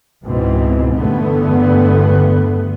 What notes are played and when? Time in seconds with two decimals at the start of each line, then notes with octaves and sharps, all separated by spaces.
0.23 C#2 G#2 B2 E3 C4
0.95 E2 G2 D3 A3 B3